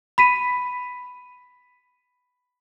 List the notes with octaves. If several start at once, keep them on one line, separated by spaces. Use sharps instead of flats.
B5 B6 D#7